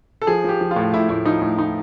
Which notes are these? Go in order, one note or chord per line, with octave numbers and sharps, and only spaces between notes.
A4
F3 G#4
F3 G4
F3
F4
A2
A2 E4
A2 E4
F3 D#4
A2
A2 D#4